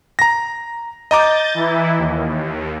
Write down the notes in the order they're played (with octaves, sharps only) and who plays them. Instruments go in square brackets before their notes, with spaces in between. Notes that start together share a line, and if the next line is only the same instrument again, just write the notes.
[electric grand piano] A#5 A#6
[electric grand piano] D#5 A#5 D6 [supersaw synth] G6 A6
[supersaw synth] E3 E4
D#2